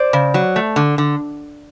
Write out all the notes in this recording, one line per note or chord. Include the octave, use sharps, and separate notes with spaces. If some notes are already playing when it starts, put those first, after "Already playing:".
Already playing: C5 D5
C#3
F#3
A3
D3
D3